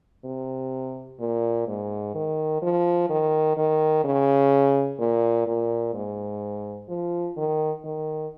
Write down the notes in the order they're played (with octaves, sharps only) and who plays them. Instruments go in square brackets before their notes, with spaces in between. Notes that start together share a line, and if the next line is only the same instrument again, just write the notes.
[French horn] C3
A#2
G#2
D#3
F3
D#3
D#3
C#3
A#2
A#2
G#2
F3
D#3
D#3